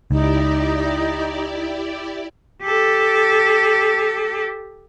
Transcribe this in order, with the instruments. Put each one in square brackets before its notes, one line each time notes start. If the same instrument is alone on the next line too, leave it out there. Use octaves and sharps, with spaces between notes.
[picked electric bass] C#2 [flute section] D#4 [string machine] E4 G4 D5
[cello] G4 A4